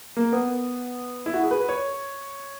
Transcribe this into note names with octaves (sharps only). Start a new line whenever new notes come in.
A#3
B3
E4
F#4
G#4
B4
C#5